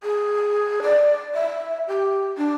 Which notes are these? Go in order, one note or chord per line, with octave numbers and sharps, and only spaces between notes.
G#4
D5
E5
G4
D4